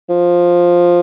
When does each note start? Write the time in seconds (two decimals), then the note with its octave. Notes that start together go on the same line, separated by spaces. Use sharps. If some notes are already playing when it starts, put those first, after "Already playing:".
0.09 F3